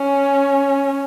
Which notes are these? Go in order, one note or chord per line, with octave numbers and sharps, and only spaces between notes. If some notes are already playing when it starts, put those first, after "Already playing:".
Already playing: C#4